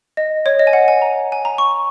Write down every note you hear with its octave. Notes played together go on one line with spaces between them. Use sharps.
D#5
C#5
D#5
G#5
F#5
G#5
A#5
G#5
A#5
C#6